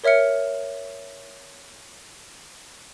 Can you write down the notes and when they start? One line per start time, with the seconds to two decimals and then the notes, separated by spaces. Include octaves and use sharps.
0.04 A#4 C#5 E5 F6 C#7